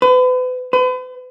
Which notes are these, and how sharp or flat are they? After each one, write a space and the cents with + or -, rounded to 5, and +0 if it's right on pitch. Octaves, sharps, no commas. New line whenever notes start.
B4 +40
B4 +45